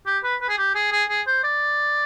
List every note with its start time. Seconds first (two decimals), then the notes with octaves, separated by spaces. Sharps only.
0.06 G4
0.23 B4
0.41 B4
0.49 G#4
0.58 G4
0.75 G#4
0.92 G#4
1.09 G#4
1.27 C5
1.44 D5